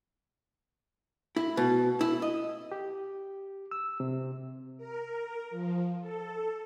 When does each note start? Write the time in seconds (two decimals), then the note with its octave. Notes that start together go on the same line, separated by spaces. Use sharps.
1.36 E4
1.57 B2
2.01 E4
2.22 D#5
2.72 G4
3.71 E6
4.00 C3
4.78 A#4
5.50 F3
6.01 A4